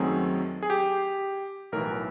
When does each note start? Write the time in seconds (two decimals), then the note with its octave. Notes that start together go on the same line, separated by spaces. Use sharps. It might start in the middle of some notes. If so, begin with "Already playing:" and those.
Already playing: F#2 D#3 F#3 A3 C4 G#4
0.63 G#4
0.70 G4
1.72 B1 A2 E3 A#4